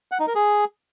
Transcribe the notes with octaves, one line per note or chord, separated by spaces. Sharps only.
F#5
D#4
A#4
G#4